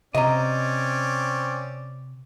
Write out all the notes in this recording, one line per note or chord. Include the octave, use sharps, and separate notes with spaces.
C3 C4 C#4 D5 D#5 A#5